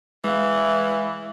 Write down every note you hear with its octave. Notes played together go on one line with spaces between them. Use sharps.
E3 G#3 F5